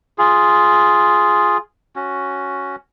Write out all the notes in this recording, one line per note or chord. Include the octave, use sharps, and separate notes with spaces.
F4 G#4
C#4 F#4